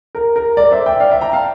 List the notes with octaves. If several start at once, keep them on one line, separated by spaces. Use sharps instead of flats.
A#4
A#4
A#4 D5
C5 E5
E5 G5
D5 F5
E5 G5
G5 A#5
F5 A5